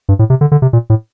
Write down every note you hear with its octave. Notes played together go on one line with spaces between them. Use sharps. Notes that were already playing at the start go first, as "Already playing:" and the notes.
G2
A2
C3
D3
D3
C3
A#2
A2